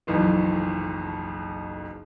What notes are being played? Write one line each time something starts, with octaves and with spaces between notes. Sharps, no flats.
F#1 B1 F2 E3